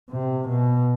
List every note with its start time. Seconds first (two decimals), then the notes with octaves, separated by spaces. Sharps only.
0.11 C3
0.49 B2